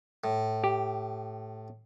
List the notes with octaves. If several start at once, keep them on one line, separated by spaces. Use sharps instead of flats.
A2
G4